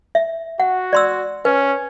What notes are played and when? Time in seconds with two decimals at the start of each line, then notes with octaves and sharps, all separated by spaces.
0.15 E5
0.60 F#4 F#5
0.93 D5 C6 E6
1.45 C#4 B4